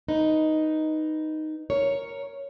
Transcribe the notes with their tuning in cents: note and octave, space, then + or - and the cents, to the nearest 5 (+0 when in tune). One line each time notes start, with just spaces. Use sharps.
D#4 +0 B4 +0
A#4 +0 C#5 +0